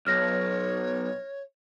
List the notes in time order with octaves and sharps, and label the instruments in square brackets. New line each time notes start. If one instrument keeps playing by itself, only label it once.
[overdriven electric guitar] B1 [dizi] C#5 [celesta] F6 A#6